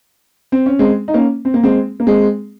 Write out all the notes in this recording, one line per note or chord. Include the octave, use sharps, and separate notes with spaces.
C4
C#4
G#3 C4
D#4
A#3 C#4
C4
A#3
G#3 C4
A#3
G#3 C4